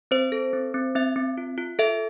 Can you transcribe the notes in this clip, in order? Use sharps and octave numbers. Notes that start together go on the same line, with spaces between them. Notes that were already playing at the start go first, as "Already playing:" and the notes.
C4 C5
A4
C4
C4
C4 E5
C4
F4
F4
A4 E5